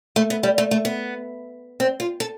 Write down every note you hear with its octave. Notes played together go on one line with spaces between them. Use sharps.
A3
B3
G3
A3
A3
B3
C4
F4
A4